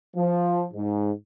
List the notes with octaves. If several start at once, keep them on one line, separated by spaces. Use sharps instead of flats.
F3
G#2